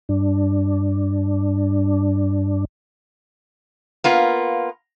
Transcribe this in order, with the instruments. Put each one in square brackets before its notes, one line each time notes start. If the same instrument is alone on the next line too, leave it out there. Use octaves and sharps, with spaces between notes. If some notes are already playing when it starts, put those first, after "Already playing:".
[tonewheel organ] G2 D4
[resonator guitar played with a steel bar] A#3 B3 F4